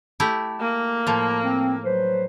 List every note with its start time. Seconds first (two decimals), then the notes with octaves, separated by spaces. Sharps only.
0.20 A3 E4 G4
0.60 A#3
1.07 A2 F3
1.44 C4
1.84 F#3 B4 C5